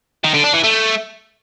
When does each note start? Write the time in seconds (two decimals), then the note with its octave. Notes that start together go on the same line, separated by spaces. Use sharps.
0.24 D#3
0.34 D3
0.44 D4
0.54 E3
0.64 A3